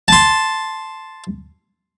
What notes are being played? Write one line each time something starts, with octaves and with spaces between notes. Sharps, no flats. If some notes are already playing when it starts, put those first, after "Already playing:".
A5 C6